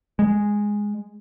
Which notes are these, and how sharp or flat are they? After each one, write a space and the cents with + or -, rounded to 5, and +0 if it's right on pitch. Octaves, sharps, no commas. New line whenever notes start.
G#3 -5